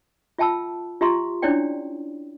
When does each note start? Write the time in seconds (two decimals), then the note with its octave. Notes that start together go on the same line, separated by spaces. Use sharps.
0.38 F4 E5 G5 A5 B5 E6
1.01 F4 G4 E5 A#5 C6 C#6
1.42 C#4 D4 E4 C#5 D5 G5